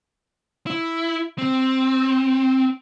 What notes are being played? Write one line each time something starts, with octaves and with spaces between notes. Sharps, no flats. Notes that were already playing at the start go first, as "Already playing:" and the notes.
E4
C4